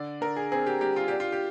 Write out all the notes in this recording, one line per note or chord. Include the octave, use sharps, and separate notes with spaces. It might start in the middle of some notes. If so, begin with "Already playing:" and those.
Already playing: D3 D5
D3 A#4
G#4
C4 G#4
G4
G3 G4
F4
D4 G4
F4
G4